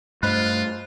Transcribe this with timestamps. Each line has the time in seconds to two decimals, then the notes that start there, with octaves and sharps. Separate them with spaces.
0.23 G2 A3 F4 C5 D#5 B5 F#6